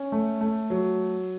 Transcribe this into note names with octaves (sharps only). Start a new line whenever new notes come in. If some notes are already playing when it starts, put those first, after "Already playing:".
Already playing: C#4
A3
A3
F#3